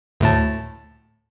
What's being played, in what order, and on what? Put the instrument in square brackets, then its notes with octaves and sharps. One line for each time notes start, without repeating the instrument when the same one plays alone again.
[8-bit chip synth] D2 A2 A5